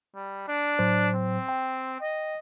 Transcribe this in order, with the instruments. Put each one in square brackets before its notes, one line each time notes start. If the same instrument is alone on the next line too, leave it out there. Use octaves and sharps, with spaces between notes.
[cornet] G3
D4
[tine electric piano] A2 F#3 C5
[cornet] C4
[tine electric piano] G5
[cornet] D#5